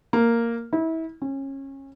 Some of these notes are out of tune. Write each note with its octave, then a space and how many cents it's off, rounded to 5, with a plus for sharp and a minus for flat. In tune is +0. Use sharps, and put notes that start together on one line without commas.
A#3 -5
E4 -30
C#4 -25